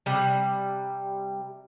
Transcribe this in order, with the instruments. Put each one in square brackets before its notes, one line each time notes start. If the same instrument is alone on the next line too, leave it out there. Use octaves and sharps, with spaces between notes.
[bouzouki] C3 G3